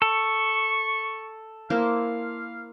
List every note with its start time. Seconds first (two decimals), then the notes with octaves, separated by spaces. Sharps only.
0.02 A4 C#6
1.70 A#3 E4 C5 F5